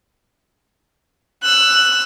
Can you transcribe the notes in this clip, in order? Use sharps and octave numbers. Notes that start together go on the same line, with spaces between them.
E6 F#6